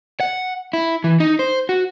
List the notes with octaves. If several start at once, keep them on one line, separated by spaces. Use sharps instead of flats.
F#5
E4
E3
D#4
C5
F#4